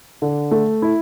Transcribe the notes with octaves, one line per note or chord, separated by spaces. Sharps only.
D3
A3
E4